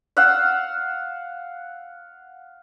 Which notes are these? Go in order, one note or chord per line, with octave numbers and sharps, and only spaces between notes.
F5 F#5 E6